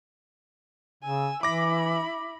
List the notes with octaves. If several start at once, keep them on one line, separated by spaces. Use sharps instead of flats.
C#3 G#5 E6
E3 E4 B5 D6 A#6